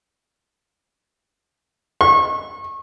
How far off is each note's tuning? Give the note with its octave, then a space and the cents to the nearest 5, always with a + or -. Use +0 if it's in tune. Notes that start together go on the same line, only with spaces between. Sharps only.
C#6 -30